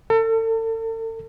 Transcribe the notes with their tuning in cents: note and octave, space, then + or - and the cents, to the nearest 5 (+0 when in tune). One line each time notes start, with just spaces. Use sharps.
A4 +40